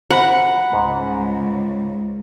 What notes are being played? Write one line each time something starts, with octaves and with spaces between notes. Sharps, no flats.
C5 D#5 F#5 A#5 B5
C#2 G#2